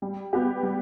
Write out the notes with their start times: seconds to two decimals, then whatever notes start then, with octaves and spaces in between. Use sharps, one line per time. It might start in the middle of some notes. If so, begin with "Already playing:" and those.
0.02 G3
0.33 B3 G4
0.63 G3